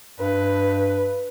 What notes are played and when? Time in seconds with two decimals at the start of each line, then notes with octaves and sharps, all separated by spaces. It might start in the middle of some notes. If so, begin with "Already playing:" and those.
0.20 G2 B4